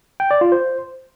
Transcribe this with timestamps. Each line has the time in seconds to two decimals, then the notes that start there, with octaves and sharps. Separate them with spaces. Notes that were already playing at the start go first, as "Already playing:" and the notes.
0.20 G5
0.31 D5
0.41 F4
0.52 C5